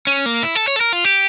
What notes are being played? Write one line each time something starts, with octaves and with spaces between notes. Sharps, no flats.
C#4
A#3
E4
A4
C#5
A4
A#4
F4
G4